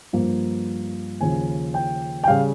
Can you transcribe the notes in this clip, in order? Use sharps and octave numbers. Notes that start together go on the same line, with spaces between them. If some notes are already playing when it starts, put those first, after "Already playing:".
G2 F3 A#3
D#2 C#3 F3 G#5
G5
G5
C#3 G3 F5